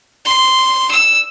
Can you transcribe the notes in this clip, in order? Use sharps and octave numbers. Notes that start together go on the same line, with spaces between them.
C6
E6